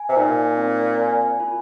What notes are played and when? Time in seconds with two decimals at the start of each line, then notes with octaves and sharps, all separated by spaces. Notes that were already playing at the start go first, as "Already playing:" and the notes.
Already playing: G#5
0.09 C3
0.16 A#2 D#4
0.57 C4
0.99 G#5
1.40 F4